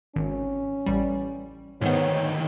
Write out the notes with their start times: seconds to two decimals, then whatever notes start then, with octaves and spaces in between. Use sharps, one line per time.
0.16 G#1 C#4
0.86 A1 G3
1.81 D2 G#2 D#3 B3 C#5